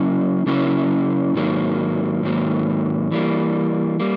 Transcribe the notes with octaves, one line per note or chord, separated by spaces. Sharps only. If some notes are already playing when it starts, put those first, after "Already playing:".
Already playing: C#3 F#3 A#3 C#4 E4
C#3 F#3 A#3 C#4 E4
G#2 D#3 F#3 A#3
G#2 D#3 F#3 A#3
E3 G3 A#3
G3 A#3